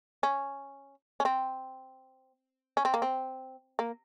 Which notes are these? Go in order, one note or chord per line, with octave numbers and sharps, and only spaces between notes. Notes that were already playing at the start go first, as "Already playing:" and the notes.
C#4
C#4
C4
C#4
C4
A#3
C4
A#3